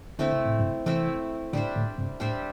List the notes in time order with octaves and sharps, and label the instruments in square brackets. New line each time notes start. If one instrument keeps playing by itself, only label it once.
[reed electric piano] D3 [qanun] A3 C4 E4
[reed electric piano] C3
A2
G2 C3
[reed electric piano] C3 E3 [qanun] A3 C4 E4
[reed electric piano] A2 D3 [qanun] G3 D4 C5 E5
[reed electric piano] A2 D3
G2 C3
[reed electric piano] A2 [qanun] G3 D4 C5 E5